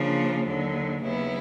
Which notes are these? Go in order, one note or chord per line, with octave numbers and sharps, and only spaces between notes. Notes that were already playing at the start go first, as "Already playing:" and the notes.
Already playing: C#3 F3 A#3 D4
D#2 D3 F#3
D#2 C#3 F#3 B3 E4